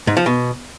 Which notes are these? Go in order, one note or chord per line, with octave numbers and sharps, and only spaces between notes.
G#2
F3
B2